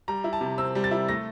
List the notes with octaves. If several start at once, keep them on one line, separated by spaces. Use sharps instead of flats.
G3 A#5
E4
A5
C3
C4 E6
G3
A6
E4
A3 A#6